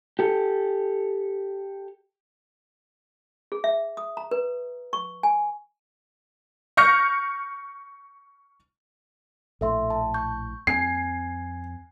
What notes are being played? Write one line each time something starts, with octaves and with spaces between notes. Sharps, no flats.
G4 A4
G#4
E5
D#6
A#5
B4
C#6
G#5
C#6 F6 G6 A#6 C#7
A#1 A2 A4 E5 C6
A5
C#6 G6
F2 C4 G#5 G#6 C7